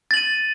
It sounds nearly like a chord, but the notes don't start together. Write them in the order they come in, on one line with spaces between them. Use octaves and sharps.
A6 F#7 D#7